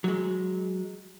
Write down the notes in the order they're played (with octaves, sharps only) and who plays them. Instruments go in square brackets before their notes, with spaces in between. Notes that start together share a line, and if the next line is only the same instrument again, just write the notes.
[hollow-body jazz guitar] F#3 G#3